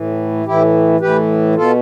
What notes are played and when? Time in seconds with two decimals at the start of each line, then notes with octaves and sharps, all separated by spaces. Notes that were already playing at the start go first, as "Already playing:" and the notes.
Already playing: A2 E3
0.46 A2 E3 E4 G4
1.00 A2 E3 G4 B4
1.55 B2 F4 A4